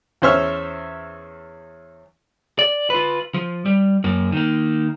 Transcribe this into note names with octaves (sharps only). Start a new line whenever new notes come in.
E2 C#4 C5 E5 C#6 F6
D5
F4 B4
F3
G3
F#2 A#3
D#3 A#3